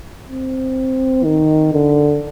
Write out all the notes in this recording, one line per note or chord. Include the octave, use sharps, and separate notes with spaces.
C4
D#3
D3